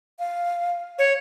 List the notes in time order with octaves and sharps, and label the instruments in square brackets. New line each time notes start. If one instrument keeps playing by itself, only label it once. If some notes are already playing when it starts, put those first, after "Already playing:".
[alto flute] F5
[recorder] C#5